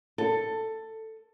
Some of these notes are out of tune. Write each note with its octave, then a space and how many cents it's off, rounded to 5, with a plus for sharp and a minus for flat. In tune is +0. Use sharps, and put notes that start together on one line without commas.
A4 +10